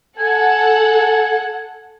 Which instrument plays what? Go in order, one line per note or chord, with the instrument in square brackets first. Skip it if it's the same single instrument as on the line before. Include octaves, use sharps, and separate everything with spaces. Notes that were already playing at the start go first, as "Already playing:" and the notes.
[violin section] A4 F#5 [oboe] G#5